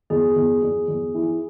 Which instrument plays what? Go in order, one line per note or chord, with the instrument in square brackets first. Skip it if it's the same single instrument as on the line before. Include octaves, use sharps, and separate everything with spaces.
[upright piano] E2 [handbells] G#4
[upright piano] E2
E2
E2
E3